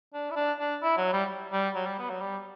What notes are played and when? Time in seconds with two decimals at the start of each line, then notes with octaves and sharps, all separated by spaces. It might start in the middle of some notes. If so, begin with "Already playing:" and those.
0.14 D4
0.31 E4
0.36 D4
0.59 D4
0.82 E4
0.97 F#3
1.13 G3
1.52 G3
1.75 F#3
1.86 G3
1.99 B3
2.10 F#3
2.21 G3